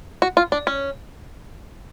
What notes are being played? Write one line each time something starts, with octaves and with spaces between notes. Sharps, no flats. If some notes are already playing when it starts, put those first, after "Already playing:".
F#4
F4
D4
C#4